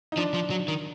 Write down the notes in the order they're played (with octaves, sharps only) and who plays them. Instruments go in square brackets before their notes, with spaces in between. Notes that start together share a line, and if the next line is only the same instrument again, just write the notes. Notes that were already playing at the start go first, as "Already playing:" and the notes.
[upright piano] D#4
[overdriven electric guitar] F3 [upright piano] D4
[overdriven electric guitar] F3
F#3
D#3